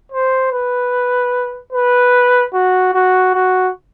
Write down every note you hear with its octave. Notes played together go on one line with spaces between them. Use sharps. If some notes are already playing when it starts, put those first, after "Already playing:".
C5
B4
B4
F#4
F#4
F#4